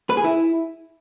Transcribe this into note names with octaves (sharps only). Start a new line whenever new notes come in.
B4
G#4
E4